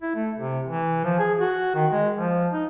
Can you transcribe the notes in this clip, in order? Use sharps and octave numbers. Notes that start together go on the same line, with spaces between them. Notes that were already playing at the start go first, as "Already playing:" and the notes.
E4
A3
C3
E3
F3
G#4
F#4
D#3
G#3
F3
D#4